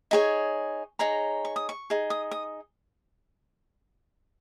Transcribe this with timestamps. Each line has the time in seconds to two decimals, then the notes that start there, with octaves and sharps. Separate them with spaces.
0.11 D#4 G#4 C#5
0.99 D#4 G#4 C#5 A#5
1.45 C#6
1.56 D#6
1.69 C#6
1.90 D#4 G#4
2.10 D#6
2.31 D#6